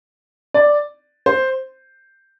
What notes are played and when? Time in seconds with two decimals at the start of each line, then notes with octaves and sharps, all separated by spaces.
0.54 D5
1.26 C5